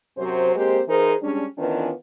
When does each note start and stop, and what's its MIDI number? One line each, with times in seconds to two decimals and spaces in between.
0.17 0.53 42
0.17 0.53 48
0.17 0.53 54
0.17 0.53 72
0.55 0.80 56
0.55 0.80 58
0.55 0.80 60
0.55 0.80 67
0.55 0.80 72
0.88 1.14 52
0.88 1.14 63
0.88 1.14 68
0.88 1.14 70
0.88 1.14 72
1.22 1.44 55
1.22 1.44 56
1.22 1.44 61
1.22 1.44 62
1.58 1.91 51
1.58 1.91 52
1.58 1.91 59
1.58 1.91 61
1.58 1.91 62
1.58 1.91 65